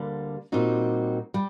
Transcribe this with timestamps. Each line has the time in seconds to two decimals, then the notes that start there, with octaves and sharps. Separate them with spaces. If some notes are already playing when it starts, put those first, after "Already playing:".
Already playing: D2 D3 G3 A#3
0.52 A#2 G3 C4 D#4 F#4
1.34 G3